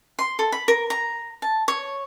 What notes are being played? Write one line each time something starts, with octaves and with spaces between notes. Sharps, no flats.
C6
A4
B5
A#4
A#5
A5
C#5